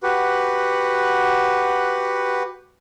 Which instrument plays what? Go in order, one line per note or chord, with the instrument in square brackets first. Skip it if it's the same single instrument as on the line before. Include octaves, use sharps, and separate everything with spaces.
[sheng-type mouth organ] F#4 G4 B4 F#5